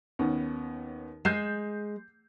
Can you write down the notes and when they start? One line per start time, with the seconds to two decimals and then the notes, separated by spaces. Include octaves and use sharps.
0.19 D#2 B3 C#4
1.25 G#3 G6 C7 E7